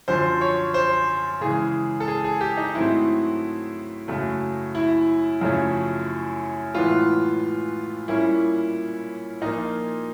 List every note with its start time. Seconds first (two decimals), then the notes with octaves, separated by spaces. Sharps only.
0.08 F#2 D3 F3 C5
0.41 C#5
0.74 C5
1.41 C#3 E3 G#3 G#4
2.00 A4
2.08 G#4
2.24 G#4
2.41 G4
2.57 D#4
2.75 G#2 D#3 F#3 A3 C4 E4
4.08 F#2 C#3 F#3 A3
4.75 E4
5.41 F#2 C#3 F3 A3 C#4
6.75 A2 E3 G#3 B3 F4
8.08 A#2 G3 A#3 C#4 E4
9.42 A#2 F3 A#3 D#4